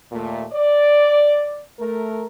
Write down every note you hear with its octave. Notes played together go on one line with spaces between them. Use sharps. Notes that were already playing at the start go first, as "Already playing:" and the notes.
D#2 A#2 A3
D5
A3 A#4